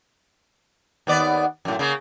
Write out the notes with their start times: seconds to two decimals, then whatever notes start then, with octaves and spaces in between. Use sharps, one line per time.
1.07 D#2 B3 D5
1.65 F#2 A2
1.79 C#3 A#3